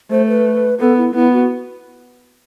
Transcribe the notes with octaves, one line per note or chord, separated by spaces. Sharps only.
A3 C5
B4
B3 A4
E4
B3 E4
F#4